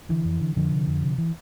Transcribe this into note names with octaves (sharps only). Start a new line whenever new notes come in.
D3 E3
F2
D3
F2 D3 F3
C3
F2
C3
E3